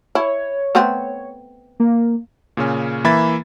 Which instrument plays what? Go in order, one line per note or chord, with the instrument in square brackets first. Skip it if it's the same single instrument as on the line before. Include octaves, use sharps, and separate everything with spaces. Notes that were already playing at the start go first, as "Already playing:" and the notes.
[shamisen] E4 [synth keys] C#5
[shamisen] A3 B3 C4
[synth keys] A#3
[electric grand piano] A#2 C#3 C#4
E3 A#3 E5 B5 G#6 A6